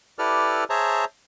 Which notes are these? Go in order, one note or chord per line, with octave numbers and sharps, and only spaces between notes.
E4 G4 A4 B4 D5 F6
G#4 C5 C#5 E5 A5 A#5